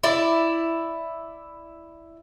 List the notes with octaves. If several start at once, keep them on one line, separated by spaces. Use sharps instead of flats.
E4 D5